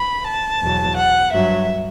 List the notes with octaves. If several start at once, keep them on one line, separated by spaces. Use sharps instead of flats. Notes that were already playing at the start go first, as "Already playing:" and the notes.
Already playing: B5
A5
E2 B2 F#3
F#5
G2 F#3 E5